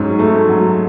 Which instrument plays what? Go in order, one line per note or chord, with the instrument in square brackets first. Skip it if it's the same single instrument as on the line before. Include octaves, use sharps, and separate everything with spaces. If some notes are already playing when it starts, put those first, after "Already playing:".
Already playing: [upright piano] G#2 F#3 C#4
A3
F#3